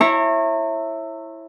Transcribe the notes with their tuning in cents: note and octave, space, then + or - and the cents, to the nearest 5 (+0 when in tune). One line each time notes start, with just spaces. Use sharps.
E4 +0 C#5 -30 A#5 -40